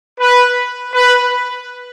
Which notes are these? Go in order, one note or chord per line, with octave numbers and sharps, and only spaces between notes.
B4
B4